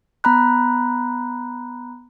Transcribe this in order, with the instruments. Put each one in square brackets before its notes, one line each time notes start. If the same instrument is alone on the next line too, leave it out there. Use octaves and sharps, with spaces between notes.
[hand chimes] B3 A#5 B5 F#6